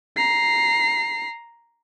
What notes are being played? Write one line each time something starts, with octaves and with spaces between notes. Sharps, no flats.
A#5 C7